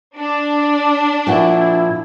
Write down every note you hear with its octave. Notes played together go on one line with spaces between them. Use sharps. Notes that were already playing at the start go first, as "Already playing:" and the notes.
D4
A#2 F3 E4 F#4